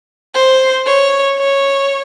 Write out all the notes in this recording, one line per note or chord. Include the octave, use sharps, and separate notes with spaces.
C5
C#5
C#5